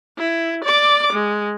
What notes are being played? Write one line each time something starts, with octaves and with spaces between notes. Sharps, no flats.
E4
D5 D6
G#3